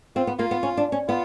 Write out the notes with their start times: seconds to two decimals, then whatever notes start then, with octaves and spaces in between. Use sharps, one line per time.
0.16 C4 F4
0.27 B3
0.39 A#3 F4
0.51 B3
0.63 C#4
0.77 D4
0.92 C#4
1.08 B3 F4